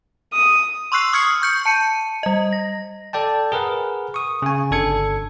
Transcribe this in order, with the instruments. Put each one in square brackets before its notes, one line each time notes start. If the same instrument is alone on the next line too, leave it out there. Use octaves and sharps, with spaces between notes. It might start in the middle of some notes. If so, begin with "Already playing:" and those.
[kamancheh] D#6
[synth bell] C6 C#6 E6 F#6 C7
C#6 D#6 F6 G#6 C7 C#7
C#6 G6 C#7
A5 C#7 D#7
G3 D#5
A#6
[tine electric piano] A4 D5 G5 A5
G#4 A#4 B4 F#5
C#6 D#6
C#3 G#5
G1 D4 A4 G#6 C#7